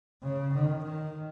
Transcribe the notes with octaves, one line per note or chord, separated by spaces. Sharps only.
C#3
D#3
D#3